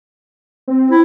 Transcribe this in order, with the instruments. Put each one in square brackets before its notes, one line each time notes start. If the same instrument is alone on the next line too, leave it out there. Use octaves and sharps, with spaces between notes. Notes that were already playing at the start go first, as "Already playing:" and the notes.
[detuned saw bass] C4
[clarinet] E4